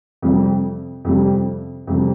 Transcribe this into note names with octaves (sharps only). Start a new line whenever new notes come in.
F2 C3 G3
F2 C3 G3
F2 C3 G3